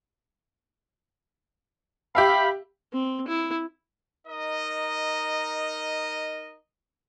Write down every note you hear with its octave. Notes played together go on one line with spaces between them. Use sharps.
G4 E5 F5 B5
C4
E4
D#4 A#4 D#5